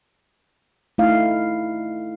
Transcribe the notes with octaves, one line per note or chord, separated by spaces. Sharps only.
A3 D#4 E4 F5